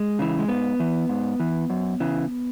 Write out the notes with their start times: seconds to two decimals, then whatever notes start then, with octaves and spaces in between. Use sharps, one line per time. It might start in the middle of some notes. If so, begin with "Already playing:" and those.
Already playing: G#3
0.19 C#3 E3
0.39 G#3
0.48 G#2 B3
0.80 E3
1.09 G#2
1.40 E3
1.70 F#2
2.00 C#3 E3